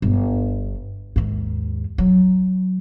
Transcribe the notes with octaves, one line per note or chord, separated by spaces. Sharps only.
G1
D#2 G#2
F#3